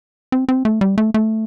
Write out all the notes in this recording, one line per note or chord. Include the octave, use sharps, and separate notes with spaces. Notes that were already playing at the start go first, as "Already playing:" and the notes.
C4
C4
A3
G3
A3
A3